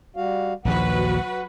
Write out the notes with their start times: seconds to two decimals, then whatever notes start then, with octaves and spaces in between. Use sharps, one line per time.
0.16 G3 F#4 F5
0.65 A#1 D#2 F3 F#3 F#4 B4 F#5